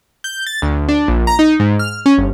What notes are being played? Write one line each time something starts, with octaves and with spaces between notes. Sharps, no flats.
G6
A6
D2
D4
A#1
A#5
D#4
G#2
F6
C#4
G1